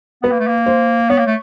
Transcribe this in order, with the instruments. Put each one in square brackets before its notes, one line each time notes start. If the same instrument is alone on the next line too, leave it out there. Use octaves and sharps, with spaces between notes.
[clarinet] B3 [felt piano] B4
[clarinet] A#3
A3
A#3
[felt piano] C5
[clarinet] B3 [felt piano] C#5
[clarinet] A#3
A3